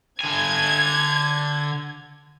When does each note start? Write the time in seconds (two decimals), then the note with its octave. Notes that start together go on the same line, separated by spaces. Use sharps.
0.21 D3 G#5 G#6